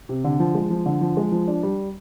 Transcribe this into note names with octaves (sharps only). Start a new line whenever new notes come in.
C3
D3
F3
G#3
F3
D3
F3
G#3
F3
D4
G3